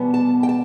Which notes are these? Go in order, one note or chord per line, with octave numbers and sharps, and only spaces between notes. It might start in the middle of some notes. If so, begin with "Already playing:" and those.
Already playing: E2 B2 G3 B3
A5
G5
A5